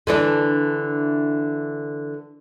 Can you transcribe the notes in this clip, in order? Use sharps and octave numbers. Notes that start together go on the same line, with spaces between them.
D3 E3 D4